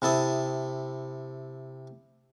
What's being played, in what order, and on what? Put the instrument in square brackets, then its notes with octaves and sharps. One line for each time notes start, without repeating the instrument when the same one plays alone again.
[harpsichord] C3 E4 A4 D#6